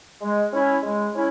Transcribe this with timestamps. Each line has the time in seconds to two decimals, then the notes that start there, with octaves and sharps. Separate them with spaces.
0.21 G#3
0.52 C#4 E4
0.83 G#3
1.14 C#4 E4